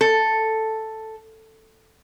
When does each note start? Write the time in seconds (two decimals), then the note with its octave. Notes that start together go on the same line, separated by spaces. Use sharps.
0.01 A4